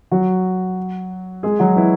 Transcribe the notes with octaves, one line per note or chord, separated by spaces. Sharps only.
F#3 F#4
G#3 G#4
F#3 F#4
E3 E4